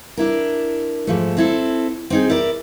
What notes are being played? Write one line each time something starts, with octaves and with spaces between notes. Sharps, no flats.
D4 E4 A#4
G#2 F3 A3
C4 E4 A4
C4 D#4 G#4
E4 A#4 D5